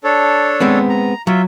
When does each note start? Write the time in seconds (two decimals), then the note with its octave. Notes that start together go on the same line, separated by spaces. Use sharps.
0.04 D4 A4 C#5
0.60 G#3 B3 C4
0.89 A#5
1.27 F#3 F4 E5